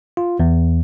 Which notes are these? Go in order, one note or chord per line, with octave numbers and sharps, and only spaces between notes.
F4
E2